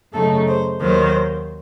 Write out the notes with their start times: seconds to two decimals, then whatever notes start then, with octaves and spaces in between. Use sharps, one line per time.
0.13 F#2 C#3 A3 D#4 A4
0.48 C5
0.81 D#2 D#3 F#3 C5